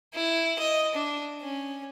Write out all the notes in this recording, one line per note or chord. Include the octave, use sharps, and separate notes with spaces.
E4
D#5
D4
C#4